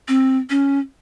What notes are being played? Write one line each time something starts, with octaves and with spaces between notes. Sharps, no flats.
C4
C#4